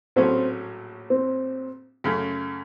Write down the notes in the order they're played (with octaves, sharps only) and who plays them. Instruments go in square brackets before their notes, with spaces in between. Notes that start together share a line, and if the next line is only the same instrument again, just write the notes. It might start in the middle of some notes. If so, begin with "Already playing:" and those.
[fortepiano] A#1 A2 F#3 A3 C#4 [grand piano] C4
[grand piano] C4
[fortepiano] F#2 C#3 A3